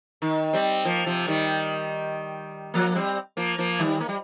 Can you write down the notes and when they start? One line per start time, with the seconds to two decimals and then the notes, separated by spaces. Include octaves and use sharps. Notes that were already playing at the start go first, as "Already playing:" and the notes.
0.22 D#3
0.53 G3 C4
0.85 F3 A#3
1.06 C3 F3
1.27 D#3 G3
2.74 F3 A#3
2.95 G3 C4
3.37 F3 A#3
3.58 F3 A#3
3.79 D#3 G3
4.00 A#3
4.09 G3